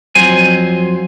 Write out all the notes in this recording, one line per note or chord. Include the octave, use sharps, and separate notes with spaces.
F2 F#3 C5 G#5